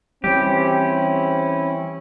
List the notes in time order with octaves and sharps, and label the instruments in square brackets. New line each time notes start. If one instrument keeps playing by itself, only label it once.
[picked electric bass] E3 G3 [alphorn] C4 [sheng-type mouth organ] C#4 E4 [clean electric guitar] G4